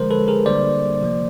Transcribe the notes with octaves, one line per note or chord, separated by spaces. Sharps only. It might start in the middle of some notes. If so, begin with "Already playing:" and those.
Already playing: D3 F3 G#3 A#4 C5
A4 B4
G#4 A#4
D3 G3 A#3 C5 D5
C3 F3 A#3